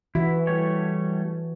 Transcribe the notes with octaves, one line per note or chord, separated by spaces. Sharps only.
E3 E4 F#4
G3 A3 C#5